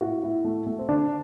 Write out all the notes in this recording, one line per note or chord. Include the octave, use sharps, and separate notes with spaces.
A2 F#4
A2
A3
A3
C4
D3 D4